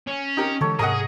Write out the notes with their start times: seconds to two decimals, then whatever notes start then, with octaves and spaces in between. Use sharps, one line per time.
0.07 C#4
0.37 D#4 G4 A#4
0.61 D3 E3 G#3 A4 C#5
0.79 G#2 C3 G#4 A#4 D#5 F#5 A#5